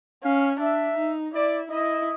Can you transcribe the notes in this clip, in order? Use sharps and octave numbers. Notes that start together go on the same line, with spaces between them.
C#4 F5
D4 E5
D#4
E4 D5
E4 D#5